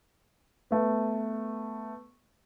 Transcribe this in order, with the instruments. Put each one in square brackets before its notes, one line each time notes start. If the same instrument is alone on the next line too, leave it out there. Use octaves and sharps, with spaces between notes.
[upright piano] A3 B3